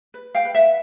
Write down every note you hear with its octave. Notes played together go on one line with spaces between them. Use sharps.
B4
F5 G5
B4
E5 F#5